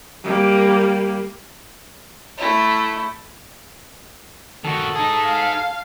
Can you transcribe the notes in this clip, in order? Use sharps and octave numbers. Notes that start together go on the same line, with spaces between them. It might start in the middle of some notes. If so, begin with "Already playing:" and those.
G3 A#3
A3 E4
D#3 F#4 A4
D#4 G#4 A5
F5